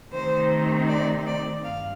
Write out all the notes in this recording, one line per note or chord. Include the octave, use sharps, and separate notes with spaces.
C3 D#3 A3 C4 D#4 C5
D5
D5
G2 F5